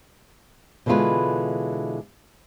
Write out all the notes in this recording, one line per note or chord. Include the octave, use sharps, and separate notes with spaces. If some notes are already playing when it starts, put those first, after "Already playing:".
B2 D3 E3 G#3 F4 B4